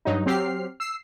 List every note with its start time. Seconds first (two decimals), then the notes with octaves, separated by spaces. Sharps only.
0.05 G2 F#3 D#4
0.26 F#3 C4 G4 F6 C7
0.80 E6 C7